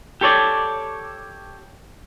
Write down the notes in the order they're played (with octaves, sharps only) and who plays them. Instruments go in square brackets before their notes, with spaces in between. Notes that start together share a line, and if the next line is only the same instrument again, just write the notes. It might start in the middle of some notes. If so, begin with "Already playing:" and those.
[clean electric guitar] G4 A4 C#5 D5